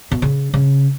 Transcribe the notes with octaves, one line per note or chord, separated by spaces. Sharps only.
B2
C#3
C#3